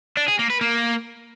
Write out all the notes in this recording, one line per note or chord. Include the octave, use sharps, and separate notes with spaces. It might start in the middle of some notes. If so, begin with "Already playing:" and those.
D4
G#4
A#3
B4
A#3